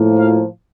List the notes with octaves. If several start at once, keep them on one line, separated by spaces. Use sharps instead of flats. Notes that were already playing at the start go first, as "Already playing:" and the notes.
Already playing: A2 F3 A#3
F5